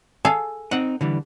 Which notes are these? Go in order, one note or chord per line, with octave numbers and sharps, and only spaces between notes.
G#4 A4 F5
C4 D#4 F#5
D3 E3 G3